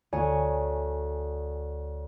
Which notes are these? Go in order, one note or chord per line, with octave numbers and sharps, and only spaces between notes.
D2 C#5 G#5